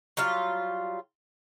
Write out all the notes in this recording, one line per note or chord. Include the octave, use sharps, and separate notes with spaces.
F#3 G3 F4 F5